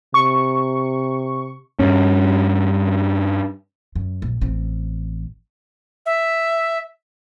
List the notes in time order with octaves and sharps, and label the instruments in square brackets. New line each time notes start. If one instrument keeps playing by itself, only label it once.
[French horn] C3 [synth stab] C#6
[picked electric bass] G2 C#4
[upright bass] F#2
A#1
A1 C4
[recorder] E5